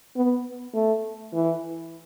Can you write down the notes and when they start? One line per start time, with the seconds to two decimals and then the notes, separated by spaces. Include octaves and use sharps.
0.16 B3
0.74 A3
1.34 E3